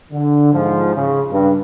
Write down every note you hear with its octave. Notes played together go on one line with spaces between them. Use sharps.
D3
G#2 F3
C#3
G2